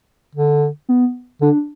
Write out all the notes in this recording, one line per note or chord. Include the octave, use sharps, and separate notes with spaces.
D3
B3
D3 D4